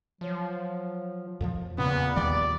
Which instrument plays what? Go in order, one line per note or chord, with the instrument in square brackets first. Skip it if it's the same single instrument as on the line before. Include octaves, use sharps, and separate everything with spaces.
[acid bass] F3 [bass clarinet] F#3
[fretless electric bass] F2 A#2 F3
[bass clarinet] E2 [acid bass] A#2 [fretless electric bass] C#3 C4 [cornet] B3
[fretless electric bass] D#2 D#3 G3 [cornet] D5